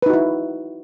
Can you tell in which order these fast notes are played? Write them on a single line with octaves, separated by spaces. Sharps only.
B4 D#4 F#4 E4